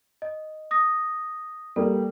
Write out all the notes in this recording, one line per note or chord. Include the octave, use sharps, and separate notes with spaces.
D#5
D#6 A#6
G3 A#3 A4